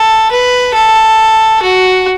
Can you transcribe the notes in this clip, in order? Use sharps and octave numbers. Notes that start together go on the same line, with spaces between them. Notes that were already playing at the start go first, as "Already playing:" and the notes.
Already playing: A4
B4
A4
F#4